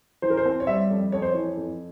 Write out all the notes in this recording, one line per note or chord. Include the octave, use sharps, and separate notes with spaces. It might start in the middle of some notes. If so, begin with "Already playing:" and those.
E3 C5
A#4
C5
C4
C#5
G3 E5
F2
F2 C#5
C5
C#5
E3
F2